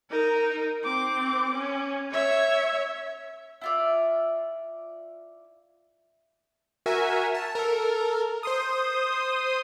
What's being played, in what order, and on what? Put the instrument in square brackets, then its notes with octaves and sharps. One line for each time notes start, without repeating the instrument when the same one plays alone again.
[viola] D#4 A#4
C4 D6
C#4
C#5 E5
[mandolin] E4 F4 D5
[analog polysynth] F#4 A#4 E5 G#5
A5
A4 A#4
C5 C6 D#6